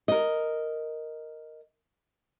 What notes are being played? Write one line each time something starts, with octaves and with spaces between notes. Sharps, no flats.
A#4 D#5